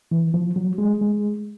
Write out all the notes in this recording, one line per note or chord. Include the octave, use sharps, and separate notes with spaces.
E3
F3
F#3
G#3
G#3